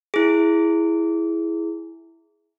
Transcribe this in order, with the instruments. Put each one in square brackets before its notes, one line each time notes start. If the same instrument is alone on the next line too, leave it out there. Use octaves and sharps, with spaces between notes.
[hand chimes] E4 G#4